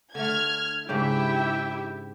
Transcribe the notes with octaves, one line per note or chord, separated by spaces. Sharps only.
D3 A3 F6 G#6
G#2 C#3 D4 E4 G4 E5 G5